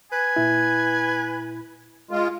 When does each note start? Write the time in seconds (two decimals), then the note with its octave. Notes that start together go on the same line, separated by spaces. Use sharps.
0.12 B4 G#5
0.36 A#2 E4
2.11 G#3 F4